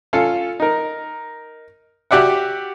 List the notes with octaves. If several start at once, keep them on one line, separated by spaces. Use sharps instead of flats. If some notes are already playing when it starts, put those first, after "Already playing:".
C#4 F4 A4 F5
D#4 A#4
F#4 G4 D5 E5 F#5